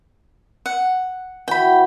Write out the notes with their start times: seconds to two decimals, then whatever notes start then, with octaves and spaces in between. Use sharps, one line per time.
0.66 F#5
1.48 E3 F#4 G5 B5